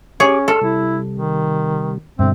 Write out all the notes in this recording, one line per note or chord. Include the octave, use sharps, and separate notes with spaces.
C#4 G4 G#4 C#5 D6
A4 C6 F6
C3 G3 E4
D#3
G2 B2 D3 C4 E5